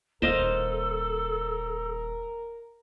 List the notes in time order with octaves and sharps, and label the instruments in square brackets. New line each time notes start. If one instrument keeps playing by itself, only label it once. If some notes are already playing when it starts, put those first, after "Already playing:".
[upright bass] D#1 D#2 [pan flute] A4 [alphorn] A#4 [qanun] C5 D#5 F5